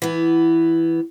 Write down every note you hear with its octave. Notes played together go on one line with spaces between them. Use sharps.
E3 B3